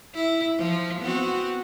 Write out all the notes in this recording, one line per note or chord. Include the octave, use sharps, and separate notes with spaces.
E4
F3
B3 C4 F#4